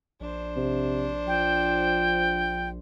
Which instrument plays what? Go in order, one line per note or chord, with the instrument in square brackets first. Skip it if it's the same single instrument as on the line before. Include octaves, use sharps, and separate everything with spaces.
[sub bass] A#1 [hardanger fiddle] D4 C5
[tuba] C3
[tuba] F3 [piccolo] G5